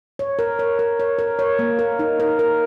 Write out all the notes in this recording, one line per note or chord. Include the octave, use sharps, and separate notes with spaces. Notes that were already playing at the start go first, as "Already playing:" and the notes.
C#5
A#4
C#5
A#4
C#5
A#4
C#5
A#3
A#4
D#4
A#4
A#4